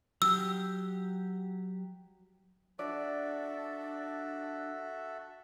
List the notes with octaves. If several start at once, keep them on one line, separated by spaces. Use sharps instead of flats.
F#3 G4 E6
D4 F#4 A4 D5 E5